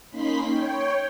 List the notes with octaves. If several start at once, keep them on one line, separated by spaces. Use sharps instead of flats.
A#3 C#4 D#4 B5 C6 B6
C#5 G5